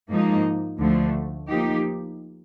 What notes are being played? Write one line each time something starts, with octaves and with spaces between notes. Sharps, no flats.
G#2 F3 A#3 D#4
D2 D3 F3 A3
F3 A#3 D#4 G4